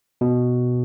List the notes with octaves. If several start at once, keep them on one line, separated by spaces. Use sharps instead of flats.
B2